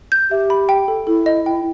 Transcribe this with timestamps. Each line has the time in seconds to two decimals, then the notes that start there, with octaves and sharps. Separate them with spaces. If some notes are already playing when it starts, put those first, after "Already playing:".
0.12 G6
0.31 G4 E5
0.50 B5
0.69 G5
0.88 A4
1.07 E4 A4
1.26 D#5
1.46 G5